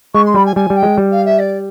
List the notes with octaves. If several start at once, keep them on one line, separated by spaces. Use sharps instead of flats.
G#3 C#6
C6
G3 B5
G#5
G3 G#5
G3
G5
G#3
G3
F5
E5
D5